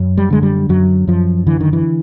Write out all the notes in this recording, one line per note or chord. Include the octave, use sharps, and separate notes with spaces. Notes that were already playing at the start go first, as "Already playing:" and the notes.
Already playing: F#2
G3
D3 G#3
G3
F#2 F#3
F#2 F3
D3 E3
D#3
E3